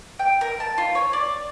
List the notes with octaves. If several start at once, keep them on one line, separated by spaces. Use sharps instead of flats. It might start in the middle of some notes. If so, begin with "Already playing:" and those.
G5
A#4
A5
F4
C#5
D5